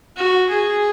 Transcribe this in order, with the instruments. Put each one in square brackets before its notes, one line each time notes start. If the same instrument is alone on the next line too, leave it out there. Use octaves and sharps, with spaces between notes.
[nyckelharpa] F#4
G#4